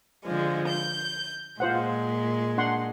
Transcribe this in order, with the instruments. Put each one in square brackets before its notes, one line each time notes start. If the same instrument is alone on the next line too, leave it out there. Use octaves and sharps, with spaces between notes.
[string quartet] D3 F3 G#3
G6
[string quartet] A#2 G#3 [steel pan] F4 C5 F#5
[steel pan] D4 F#5 C6